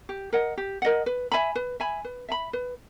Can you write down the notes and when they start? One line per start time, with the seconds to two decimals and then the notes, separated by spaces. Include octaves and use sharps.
0.09 G4
0.33 A#4 D#5 F#5
0.57 G4
0.82 A#4 D#5 F#5
1.06 B4
1.32 E5 G#5 B5
1.55 B4
1.80 E5 G#5 B5
2.05 B4
2.29 E5 G#5 B5
2.53 B4